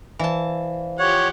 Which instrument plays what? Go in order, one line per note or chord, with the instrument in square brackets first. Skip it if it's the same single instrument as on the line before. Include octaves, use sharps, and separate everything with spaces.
[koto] E3 A5 [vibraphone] C5 D5 F5
[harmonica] F3 G4 F#5 [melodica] C#5